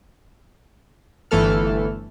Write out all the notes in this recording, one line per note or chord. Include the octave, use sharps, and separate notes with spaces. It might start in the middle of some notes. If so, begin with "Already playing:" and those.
G1 E3 A3 A4 F6